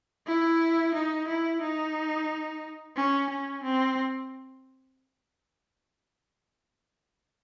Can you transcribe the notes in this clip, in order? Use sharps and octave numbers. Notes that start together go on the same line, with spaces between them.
E4
D#4
E4
D#4
C#4
C#4
C4